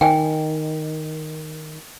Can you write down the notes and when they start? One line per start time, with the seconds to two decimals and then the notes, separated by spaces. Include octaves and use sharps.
0.01 D#3 G5 G#5